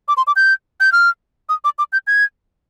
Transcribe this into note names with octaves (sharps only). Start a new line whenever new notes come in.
D6
C6
D6
G6
G6
F6
D#6
D6
D6
G6
G#6